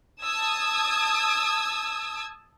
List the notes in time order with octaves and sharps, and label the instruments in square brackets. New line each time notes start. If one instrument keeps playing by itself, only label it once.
[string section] A5 D#6 E6 G#6